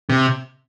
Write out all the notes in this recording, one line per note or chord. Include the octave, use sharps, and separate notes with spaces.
C3